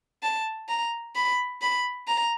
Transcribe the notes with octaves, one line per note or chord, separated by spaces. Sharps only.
A5
A#5
B5
B5
A#5